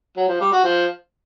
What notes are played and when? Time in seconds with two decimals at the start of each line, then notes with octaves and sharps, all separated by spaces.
0.17 F#3
0.29 F3
0.40 G3
0.52 F#4
0.64 F3